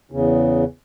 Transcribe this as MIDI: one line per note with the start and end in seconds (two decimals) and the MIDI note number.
0.12 0.64 40
0.12 0.64 49